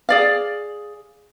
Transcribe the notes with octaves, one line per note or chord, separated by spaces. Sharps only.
G#4 D5 F5